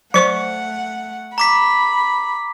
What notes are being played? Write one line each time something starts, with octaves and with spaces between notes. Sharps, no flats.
F#3 A3 C5 F#5 C#6 C#7
A#5 B5 D6 B6